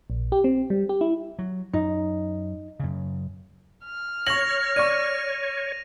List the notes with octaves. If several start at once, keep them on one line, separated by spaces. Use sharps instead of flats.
A#1
G4
C4
G3
G4
E4
F#3
F#2 D#4
F#2 C#3
F6
C#5 C#6 A#6 F7 F#7
D5 C#6 D#7